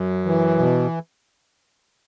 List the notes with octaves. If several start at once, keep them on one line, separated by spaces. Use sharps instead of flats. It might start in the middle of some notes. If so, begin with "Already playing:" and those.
Already playing: F#2
E3
B2